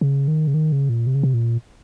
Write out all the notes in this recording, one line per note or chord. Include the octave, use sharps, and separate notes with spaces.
C#3
D#3
C#3
D#3
C#3
A#2
C3
C#3
C3
A#2